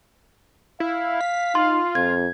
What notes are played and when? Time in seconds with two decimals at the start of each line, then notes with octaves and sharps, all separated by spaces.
0.80 E4 F5
1.21 B6
1.55 D#4 F4 C6
1.95 F2 G#6